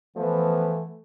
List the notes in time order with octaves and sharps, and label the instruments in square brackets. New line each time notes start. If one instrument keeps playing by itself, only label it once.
[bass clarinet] E3 [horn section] F3 B3 [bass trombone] A3